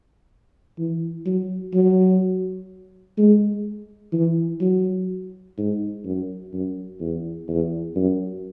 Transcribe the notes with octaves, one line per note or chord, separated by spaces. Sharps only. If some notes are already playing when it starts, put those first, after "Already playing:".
E3
F#3
F#3
G#3
E3
F#3
G#2
F#2
F#2
E2
E2
F#2